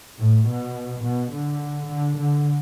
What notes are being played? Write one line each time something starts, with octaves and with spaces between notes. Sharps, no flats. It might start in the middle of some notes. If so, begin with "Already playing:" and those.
A2
B2
B2
D3
D3
D3